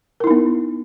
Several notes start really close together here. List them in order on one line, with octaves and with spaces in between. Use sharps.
A#4 E4 D#4 B3